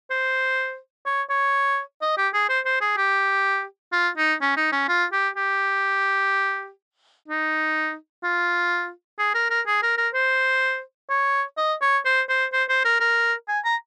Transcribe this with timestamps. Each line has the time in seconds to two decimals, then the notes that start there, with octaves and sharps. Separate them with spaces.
0.11 C5
1.06 C#5
1.30 C#5
2.02 D#5
2.18 G4
2.34 G#4
2.49 C5
2.65 C5
2.81 G#4
2.97 G4
3.92 F4
4.17 D#4
4.41 C#4
4.57 D#4
4.73 C#4
4.89 F4
5.12 G4
5.36 G4
7.28 D#4
8.23 F4
9.19 G#4
9.35 A#4
9.50 A#4
9.67 G#4
9.83 A#4
9.98 A#4
10.14 C5
11.10 C#5
11.57 D#5
11.82 C#5
12.05 C5
12.29 C5
12.53 C5
12.69 C5
12.85 A#4
13.00 A#4
13.48 G#5
13.65 A#5